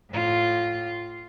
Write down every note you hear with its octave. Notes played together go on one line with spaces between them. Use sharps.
A2 F4